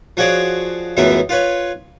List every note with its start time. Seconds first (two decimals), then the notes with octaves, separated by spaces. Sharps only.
0.17 F3 F#4 G#4 C#5 D5
0.97 C#2 F#2 A2 E3 B3 E5
1.29 F4 B4 C#5